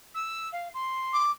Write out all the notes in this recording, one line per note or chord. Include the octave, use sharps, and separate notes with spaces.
E6
F5
C6
D6